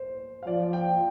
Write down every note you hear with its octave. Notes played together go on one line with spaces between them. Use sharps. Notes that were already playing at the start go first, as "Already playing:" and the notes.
Already playing: C5
F5
F3 D5
G5